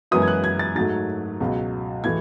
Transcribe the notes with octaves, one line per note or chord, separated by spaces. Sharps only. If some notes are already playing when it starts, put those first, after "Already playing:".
F#2 E3 G#3 B3 E4 D#6
G#6
F#6
G#6
A6
G#2 F#3 A3 A6
C#2 B2 F#3
A2 E3 G#6